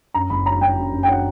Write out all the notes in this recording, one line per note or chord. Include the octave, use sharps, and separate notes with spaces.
F#2 A#5
F#1 B5
F#3 A#5
F#3 G5
F#2
F#2
G5
F#3 F#5